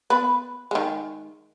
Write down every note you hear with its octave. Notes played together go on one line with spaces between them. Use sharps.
B3 B4
D#3 G#3